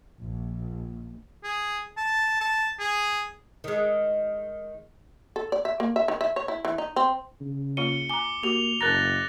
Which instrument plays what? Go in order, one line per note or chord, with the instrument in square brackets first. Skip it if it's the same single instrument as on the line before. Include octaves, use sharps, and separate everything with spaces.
[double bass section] A#1
[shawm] G#4
A5
A5
G#4
[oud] D#3 G#3
[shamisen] A4
D5
E5
A#3
E5
D#3
E5
C#5
E4
E3
D#4
C4
[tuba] C#3
[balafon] A#3 F4 C#5 [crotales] C#7 D#7 G7
[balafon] G#5 A#5 [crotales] D6 G7
[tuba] A#3 [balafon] F#4 G4 [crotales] F7
[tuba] F#1 [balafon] C#4 A#4 A#5 [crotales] F#6 A6 A#6